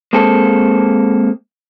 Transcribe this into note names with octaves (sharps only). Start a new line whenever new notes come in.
G#3 A#3 C4 A4